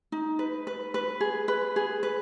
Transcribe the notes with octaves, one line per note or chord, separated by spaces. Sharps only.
D#4
B4
B4
B4
G#4
B4
G#4
B4